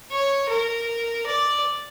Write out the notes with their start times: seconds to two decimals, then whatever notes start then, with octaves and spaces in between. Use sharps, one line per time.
0.11 C#5
0.49 A#4
1.26 D5